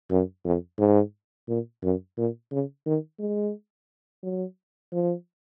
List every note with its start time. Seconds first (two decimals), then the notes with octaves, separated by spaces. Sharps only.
0.11 F#2
0.45 F2
0.79 G#2
1.48 A#2
1.83 F#2
2.17 A#2
2.52 C#3
2.86 D#3
3.20 G#3
4.23 F#3
4.92 F3